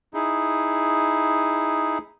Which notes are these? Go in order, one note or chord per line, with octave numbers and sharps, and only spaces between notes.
D#4 E4 G#4